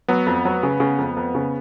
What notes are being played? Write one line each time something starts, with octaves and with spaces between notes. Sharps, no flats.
F#3 B3
F2
F#3
C#3
C#3
F2
F2
C#3